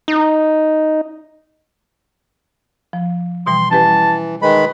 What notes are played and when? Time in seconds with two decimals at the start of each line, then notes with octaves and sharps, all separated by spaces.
0.08 D#4
2.93 F3
3.47 B2 E3 G3 C6
3.71 E3 C#4 G4 B4 A5
3.86 G3
4.42 D#3 G#3 B4 B5